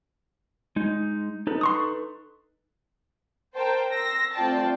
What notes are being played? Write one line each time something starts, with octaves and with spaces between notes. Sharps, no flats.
G#3 D#4
D#4 A4 B4
C6 C#6 D#6
A#4 C5 G5 A5
C6 E6 A#6
A3 C4 F4 D5 G5 A5